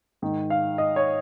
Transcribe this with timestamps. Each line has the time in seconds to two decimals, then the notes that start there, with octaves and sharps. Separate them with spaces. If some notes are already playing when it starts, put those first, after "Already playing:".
0.22 G#2 D#3
0.50 F5
0.78 D#5
0.96 C#5